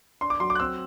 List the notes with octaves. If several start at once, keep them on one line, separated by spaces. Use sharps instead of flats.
D4 C6
D6
F#3 C6
D6
F#6
C4 E6